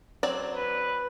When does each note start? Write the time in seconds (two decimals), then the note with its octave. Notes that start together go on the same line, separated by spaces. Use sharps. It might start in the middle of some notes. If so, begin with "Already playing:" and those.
0.23 F#3 C4 D5
0.55 B4